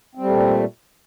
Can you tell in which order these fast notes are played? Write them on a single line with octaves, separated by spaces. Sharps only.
C4 G3 A3 A#2